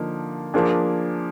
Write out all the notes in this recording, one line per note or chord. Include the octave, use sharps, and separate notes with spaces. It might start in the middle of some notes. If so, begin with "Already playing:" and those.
Already playing: D3 F3 A#3 D#4
F3 A#3 D4 G#4